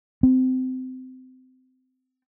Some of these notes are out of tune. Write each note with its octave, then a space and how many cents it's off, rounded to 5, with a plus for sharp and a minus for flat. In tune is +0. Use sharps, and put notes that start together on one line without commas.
C4 -25